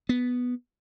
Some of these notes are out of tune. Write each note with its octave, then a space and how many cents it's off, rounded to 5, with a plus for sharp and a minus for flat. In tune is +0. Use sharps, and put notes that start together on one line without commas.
B3 +0